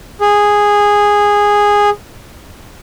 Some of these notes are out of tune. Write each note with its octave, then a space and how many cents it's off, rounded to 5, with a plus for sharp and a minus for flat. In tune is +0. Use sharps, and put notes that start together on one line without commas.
G#4 -10